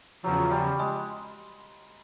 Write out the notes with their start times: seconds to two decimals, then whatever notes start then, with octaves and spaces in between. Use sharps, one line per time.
0.23 E2 C#3 F3 F#3
0.51 G3
0.79 G#3